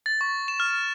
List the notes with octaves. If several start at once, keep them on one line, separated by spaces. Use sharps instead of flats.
A6
C#6
E7
F6